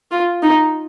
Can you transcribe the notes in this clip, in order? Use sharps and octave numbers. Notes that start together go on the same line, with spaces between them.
F4
D#4